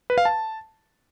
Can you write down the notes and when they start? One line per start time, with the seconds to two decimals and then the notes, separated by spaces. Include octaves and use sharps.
0.10 B4
0.18 F5
0.25 A5